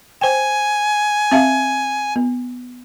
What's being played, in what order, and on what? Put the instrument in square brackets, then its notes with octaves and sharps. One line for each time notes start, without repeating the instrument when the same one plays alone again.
[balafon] C5 G5 [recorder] G#5
[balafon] C4 E5 F5
B3